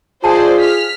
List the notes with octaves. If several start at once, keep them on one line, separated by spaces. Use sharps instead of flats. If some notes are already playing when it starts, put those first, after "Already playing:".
F4 G#4 C5 D5 D#5 G#5 A5
F6 B6